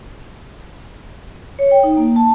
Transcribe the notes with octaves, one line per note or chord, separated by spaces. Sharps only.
C#5
G5
D#4
A#3
A5